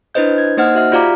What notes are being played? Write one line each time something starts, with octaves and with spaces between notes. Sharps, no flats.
D4 E4 B4 C5 D#5 G6
G#6
A#3 D#4 C5 D#5 F#5 F6
F#4 E5 F6
F4 G4 D5 F5 A#5 D6